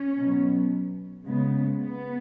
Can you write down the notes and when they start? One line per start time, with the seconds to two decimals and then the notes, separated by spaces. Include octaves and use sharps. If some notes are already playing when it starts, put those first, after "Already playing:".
Already playing: C#4
0.17 B2 F#3 B3
1.25 C#3 G#3 B3
1.80 B3